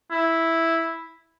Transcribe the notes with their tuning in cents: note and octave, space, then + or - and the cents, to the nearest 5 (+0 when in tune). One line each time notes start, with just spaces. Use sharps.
E4 -5